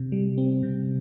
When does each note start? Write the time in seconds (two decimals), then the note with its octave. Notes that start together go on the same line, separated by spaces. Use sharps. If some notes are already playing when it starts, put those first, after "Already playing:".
Already playing: C3
0.12 G3
0.38 C4
0.63 C3